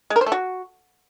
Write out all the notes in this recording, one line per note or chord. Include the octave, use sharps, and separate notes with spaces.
G#3
A#4
C5
A3
F#4